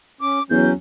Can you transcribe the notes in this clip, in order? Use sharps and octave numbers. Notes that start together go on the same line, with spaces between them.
C#4 D6
E2 F#3 C#4 G6